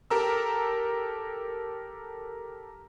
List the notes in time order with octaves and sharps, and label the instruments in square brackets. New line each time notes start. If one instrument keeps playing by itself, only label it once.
[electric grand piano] G4 A4 A#4 A#5 E6